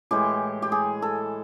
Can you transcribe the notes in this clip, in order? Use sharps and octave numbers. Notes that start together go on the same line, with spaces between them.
A2 E3 G#3 G4
G4
G#4
A4